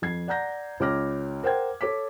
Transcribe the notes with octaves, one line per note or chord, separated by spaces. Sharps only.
F2 G#6 C7
D5 F#5 A#5 G6 A#6
C#2 C#5 D6 F6 A#6
A#4 C5 F#5 G5 G#6
A4 C#5 D6 B6